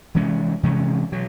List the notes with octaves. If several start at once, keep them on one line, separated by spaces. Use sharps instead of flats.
C3 E3 G#3 C#4
C3 E3 G#3 C#4
B2 F#3